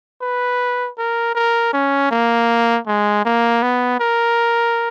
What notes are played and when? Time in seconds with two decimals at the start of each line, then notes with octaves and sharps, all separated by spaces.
0.21 B4
0.98 A#4
1.35 A#4
1.73 C#4
2.11 A#3
2.87 G#3
3.25 A#3
3.63 B3
4.00 A#4